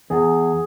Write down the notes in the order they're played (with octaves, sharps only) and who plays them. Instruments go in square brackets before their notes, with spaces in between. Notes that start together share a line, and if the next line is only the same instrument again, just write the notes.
[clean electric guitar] E2 [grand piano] G#4